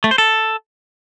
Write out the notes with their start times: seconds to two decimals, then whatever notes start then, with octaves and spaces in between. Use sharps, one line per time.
0.04 A3
0.11 C5
0.18 A4